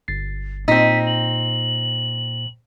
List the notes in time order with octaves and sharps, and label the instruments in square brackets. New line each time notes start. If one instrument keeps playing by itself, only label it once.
[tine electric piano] G1 A6 C7
[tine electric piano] A#2 [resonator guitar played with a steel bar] C4 D#4 [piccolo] B6
[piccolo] F#7